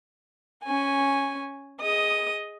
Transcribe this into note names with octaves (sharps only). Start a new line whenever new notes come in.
C#4 G#5
G#4 D#5 D#6